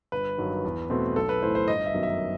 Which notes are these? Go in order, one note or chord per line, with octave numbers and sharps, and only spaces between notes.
G1 B4
G2 D#3 F#3
E2
B2 A3 C4
B1 A4
B4
A2 E3 A3 C5
C5
G1 D#5
E5
F#2 D#3 F#3 B3
E5